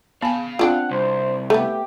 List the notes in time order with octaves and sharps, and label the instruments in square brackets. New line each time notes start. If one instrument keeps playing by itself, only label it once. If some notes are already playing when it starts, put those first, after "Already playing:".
[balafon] B3 G#5 [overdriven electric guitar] F5 B5
[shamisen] C4 D4 G5 [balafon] F4 [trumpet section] F#5
[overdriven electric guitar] C2 [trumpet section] C5
[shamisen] A3 B3 [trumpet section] G4 [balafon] A4